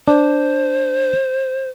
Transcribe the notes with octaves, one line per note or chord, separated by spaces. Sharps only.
D4 C5